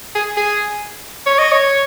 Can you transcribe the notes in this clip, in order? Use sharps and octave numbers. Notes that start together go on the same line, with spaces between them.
G#4
G#4
C#5
D#5
C#5